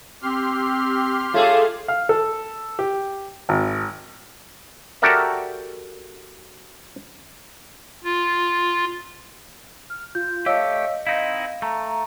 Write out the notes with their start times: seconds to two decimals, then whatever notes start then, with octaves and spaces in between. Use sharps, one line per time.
0.23 C4 G4 C6 F6
1.34 A3 F4 G#4 A4 C#5
1.88 F5
2.09 A4
2.79 G4
3.49 G#1
5.02 F#4 G4 A4 A#4 D5 E5
8.04 F4
9.90 F6
10.15 F4 G6
10.46 A3 G4 C#5 D#5 F5 E6
11.07 C4 D#4 E4 F5
11.62 A3 A#5